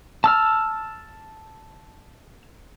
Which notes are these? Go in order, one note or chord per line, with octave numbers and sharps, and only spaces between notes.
A5 E6 F6